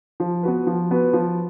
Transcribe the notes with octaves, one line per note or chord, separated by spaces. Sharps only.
F3
B3 F#4 B4
F3
B3 F#4 B4
F3